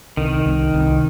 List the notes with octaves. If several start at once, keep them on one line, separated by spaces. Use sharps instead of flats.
C2 D#3
C2
C2